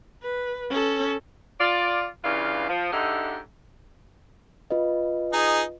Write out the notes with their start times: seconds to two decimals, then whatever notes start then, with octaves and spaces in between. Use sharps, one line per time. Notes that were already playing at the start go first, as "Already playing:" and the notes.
0.22 B4
0.70 C#4 A4
1.59 F4 D5
2.24 G2 C#3 E3 F4 D5 F5
2.69 F3
2.92 G#2 D3 D#4 E4 G4 A4
4.71 F4 B4 D#5
5.33 D#4 G#4